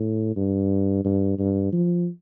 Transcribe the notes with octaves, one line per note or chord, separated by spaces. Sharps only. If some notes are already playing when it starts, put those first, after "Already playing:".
Already playing: A2
G2
G2
G2
F3